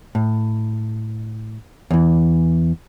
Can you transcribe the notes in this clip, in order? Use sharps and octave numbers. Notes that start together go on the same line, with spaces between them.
A2
E2 E3